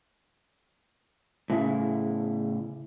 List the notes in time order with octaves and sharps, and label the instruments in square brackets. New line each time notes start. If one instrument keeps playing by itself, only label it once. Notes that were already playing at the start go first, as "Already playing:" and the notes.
[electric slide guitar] A2 C#3 E4